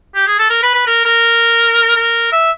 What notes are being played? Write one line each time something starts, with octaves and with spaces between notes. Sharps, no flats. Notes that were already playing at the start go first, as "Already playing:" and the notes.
G4
G#4
A4
A#4
B4
B4
A#4
A#4
A#4
E5